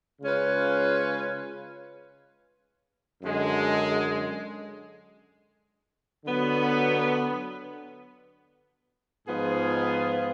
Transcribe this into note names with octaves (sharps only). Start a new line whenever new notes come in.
C#3 G#3 C#4 F4 B4
F#2 D3 G#3
D3 F#3 B3
G#2 F3 B3 F4 G#4